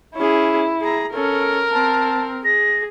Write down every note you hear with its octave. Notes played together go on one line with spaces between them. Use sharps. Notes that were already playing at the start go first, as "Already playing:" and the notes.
C#4 E4 G#4
G#4 A#5
C#4 A4 A#4
C4 A5
G#4 A#6